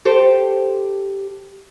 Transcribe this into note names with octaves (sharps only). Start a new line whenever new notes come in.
G4 A4 C5